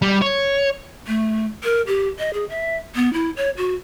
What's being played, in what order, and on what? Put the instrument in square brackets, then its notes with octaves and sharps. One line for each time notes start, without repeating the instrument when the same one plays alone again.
[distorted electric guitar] G3
C#5
[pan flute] A3
A#4
G4
D#5
G#4
E5
B3
E4
C#5
F#4